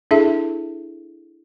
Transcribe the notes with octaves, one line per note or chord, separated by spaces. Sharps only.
D4 E4 G#4 A4 E5